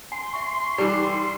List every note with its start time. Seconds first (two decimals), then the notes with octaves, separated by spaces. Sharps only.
0.12 G#5 C6
0.33 E5 C#6
0.78 E3 G3 D#4 D6